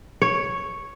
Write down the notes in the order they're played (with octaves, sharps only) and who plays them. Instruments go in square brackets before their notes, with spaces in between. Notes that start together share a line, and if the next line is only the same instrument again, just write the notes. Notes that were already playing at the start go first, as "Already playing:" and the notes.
[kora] C#5